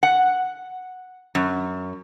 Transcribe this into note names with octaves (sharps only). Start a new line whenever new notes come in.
F#5
F#2